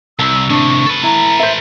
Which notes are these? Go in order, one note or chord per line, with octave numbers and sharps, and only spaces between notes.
C2 A#5 E6
A2 C3 D4 C#6
A4 B4
E4 A#5
C5 E5